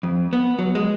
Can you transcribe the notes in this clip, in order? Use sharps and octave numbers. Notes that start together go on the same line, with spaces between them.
F2
B3
F#3
G#3